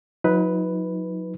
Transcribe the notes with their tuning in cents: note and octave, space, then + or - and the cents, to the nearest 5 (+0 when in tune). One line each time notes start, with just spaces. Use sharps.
F#3 -30 D#4 +35 B4 +0